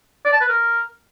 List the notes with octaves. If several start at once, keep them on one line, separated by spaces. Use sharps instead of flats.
D5
A5
B4
A#4